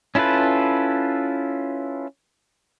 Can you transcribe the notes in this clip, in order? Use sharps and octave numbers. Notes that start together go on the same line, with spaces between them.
C#4 E4 F4 A4 B4